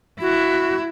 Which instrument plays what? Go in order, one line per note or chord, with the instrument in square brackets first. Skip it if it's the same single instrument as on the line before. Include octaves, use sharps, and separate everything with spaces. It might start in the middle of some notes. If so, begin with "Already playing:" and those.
[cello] E4 [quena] F#4